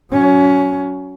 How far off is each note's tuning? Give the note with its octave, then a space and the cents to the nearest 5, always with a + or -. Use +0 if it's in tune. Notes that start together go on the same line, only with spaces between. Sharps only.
F#3 +0 C#4 +20